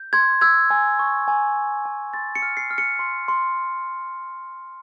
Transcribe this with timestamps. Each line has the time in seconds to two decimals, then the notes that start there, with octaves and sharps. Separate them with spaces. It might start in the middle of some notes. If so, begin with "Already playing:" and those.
Already playing: G6
0.13 C6 G#6
0.41 E6 G#6
0.70 G#5
0.99 C#6
1.28 G#5
1.56 E6
1.85 G#5
2.14 C6 A6
2.35 C#7
2.42 F6
2.57 C7
2.71 F6
2.78 C#7
2.99 C6
3.28 C6